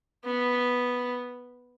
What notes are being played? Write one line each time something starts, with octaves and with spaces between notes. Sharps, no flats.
B3